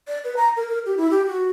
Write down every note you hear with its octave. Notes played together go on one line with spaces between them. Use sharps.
D5
B4
A#5
A#4
A#4
G4
E4
G4
F#4